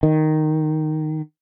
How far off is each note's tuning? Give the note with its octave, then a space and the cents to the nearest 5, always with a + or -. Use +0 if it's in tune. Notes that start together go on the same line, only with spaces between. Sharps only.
D#3 -5